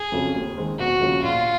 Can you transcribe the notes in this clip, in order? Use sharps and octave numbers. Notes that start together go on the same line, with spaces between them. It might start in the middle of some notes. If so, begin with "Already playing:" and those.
Already playing: G#4
F2 C#3 F#3
D#2
D#3 G#3 C4
E1 F#4
D#2 C#3 F3
A#1 F4